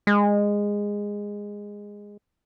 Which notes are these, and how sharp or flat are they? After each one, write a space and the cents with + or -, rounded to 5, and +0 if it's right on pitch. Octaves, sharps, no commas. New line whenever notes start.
G#3 -15